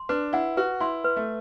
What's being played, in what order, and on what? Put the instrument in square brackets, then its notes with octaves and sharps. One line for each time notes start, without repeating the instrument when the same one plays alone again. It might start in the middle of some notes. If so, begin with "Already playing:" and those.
Already playing: [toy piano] C6
[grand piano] D4 [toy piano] B4
[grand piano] E4 [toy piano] F#5
[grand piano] F#4 [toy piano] B4
[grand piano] E4 [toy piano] C6
[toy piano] B4
[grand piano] A3